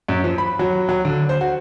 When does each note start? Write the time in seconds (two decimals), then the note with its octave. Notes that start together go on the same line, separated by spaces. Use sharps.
0.09 F#2
0.24 F3
0.38 B5
0.59 F#3
0.89 F#3
1.05 D3
1.29 C5
1.41 F#4